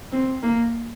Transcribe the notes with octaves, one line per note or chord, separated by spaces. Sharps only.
C4
A#3